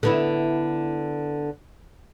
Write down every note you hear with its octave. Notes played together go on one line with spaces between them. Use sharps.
D3 B3 E4